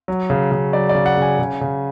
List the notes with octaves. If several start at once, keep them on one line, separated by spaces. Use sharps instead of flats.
F#3
C#3
C#3
F#3 D5
D5
C#3
F#5
C#3 G#5
C#3
C#3